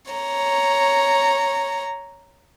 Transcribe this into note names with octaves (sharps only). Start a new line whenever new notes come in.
C#5 A#5